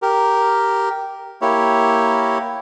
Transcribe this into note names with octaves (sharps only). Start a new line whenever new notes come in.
G4 A#4
A#3 E4 G4 C#5